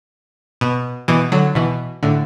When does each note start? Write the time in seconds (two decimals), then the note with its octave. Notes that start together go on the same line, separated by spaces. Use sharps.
0.61 B2
1.08 B2 E3
1.32 D3 F#3
1.55 B2 E3
2.03 A2 D3